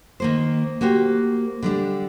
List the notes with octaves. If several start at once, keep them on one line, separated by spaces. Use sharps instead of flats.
D#3 A#3 C5
A#3 F#4 G4 C5
D3 G3 D4